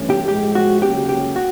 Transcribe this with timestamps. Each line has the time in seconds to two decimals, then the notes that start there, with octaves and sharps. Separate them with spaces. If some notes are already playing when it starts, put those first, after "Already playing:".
Already playing: G2 E3 A3 C#4
0.10 G4
0.28 A2 F3 G#3 G4
0.55 F#4
0.82 D2 C#3 F#3 A#3 C#4 G4
1.09 G4
1.36 F#4